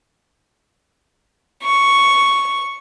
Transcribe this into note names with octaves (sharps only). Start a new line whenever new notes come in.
C#6